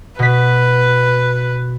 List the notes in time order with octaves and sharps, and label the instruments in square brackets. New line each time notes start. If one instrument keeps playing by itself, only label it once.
[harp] B2 B6 [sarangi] B4